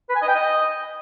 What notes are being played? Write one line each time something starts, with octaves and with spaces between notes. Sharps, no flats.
B4
G#5
D#5
G5
D#5